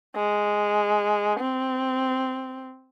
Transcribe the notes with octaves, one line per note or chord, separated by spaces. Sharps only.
G#3
C4